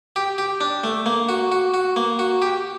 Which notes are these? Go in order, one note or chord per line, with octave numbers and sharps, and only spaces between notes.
G4
G4
D4
A3
A#3
F#4
F#4
F#4
A#3
F#4
G4